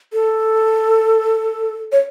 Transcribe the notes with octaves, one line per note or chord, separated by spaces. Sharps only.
A4
C#5